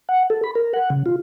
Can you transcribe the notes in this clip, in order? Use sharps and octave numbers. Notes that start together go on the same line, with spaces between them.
F#5
A4
B5
A#4
F#5
C#3
F4